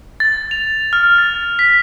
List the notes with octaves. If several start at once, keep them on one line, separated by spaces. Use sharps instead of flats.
A6
F7
F6
A6
B6